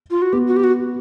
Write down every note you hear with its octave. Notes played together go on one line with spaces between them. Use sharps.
F4
F#4
B3 G4
F#4
G4
F#4